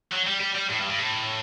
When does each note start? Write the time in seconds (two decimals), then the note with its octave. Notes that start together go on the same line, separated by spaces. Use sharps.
0.12 F#3
0.26 G3
0.40 G3
0.55 G3
0.70 A2
0.79 G2
0.90 G2
0.99 A2